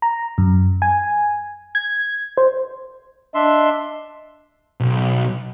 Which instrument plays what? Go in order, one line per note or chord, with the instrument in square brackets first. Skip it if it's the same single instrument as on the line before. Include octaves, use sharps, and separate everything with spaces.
[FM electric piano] A#5
F#2
G#5
G#6
C5
[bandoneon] D4 E5 C6 [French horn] D#5
[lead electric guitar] B1